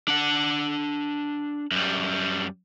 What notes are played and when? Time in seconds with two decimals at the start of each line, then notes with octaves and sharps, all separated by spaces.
0.08 D4 F#5
1.71 F#2 G3